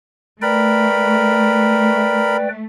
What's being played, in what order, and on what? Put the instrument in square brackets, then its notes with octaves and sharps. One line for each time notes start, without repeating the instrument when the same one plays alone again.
[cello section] A3 [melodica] A#4 B5 [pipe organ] B4 D5 G5